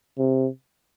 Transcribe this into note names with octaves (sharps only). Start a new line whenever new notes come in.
C3